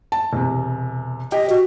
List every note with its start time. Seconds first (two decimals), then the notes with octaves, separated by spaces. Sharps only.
0.12 A5
0.33 E1 C3
1.32 G4 D#5
1.50 F#4